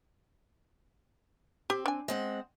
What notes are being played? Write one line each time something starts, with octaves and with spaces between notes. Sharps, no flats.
C4 G4
D4 G#5
G#3 C4 F#5